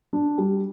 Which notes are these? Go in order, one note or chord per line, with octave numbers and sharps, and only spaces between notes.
D4
G3